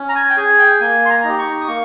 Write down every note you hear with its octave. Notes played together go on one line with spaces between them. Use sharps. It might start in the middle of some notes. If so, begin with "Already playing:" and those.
Already playing: C#4
A#5
G#5
G5
G#4 G#5
G5
A#3 G#5
C6
A#5
D#4 G4
C#6
D#6
A#3 C#6